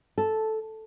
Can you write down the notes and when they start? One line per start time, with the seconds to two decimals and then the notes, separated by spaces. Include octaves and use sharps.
0.18 A4